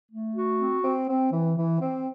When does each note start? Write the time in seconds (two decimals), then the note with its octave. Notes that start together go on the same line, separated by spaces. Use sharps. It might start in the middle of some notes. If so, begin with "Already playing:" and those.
0.11 A3
0.35 F#4
0.60 C4
0.83 C4
1.08 C4
1.31 E3
1.56 E3
1.80 C4